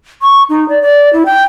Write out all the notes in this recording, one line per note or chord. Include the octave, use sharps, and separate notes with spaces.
C#6
D#4
D5
D5
E4
G5